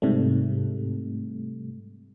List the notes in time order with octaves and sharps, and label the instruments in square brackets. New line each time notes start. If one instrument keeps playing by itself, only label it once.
[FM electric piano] G#2 C3 G3 A3